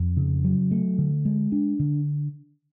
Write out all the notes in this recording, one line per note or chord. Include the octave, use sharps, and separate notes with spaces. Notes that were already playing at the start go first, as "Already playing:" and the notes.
Already playing: F2
C#3
F#3
A3
D3
G#3
D4
D3